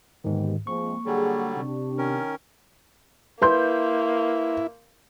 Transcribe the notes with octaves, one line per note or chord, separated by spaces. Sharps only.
D#2 G#2 D3 D#3 B3 G4
F3 G#3 A#3 C4 C#6
D3 F#3 G3 G#4
C3 D4 G4
D#3 C#4 A#4
A#3 E4 B4 C6 G6